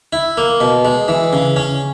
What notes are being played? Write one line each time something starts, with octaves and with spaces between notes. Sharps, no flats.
E4
A#3
B2
G#3
E3
C#3
C#4